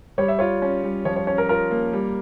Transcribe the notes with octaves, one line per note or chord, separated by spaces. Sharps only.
G3 C#5
E5
F4 C#5
C#4
G3
F3 C#5
C#5
C#4 C#5
A#4
F4 A#4
A#3
G3